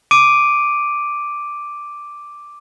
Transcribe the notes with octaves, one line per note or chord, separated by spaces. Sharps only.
D6 D7 D#7